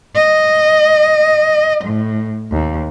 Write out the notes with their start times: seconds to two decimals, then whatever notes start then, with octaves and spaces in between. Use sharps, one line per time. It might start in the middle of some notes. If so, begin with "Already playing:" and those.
0.16 D#5
1.85 A2
2.52 D#2